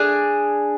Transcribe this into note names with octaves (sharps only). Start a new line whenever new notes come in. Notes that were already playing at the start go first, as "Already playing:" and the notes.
Already playing: D4 G#4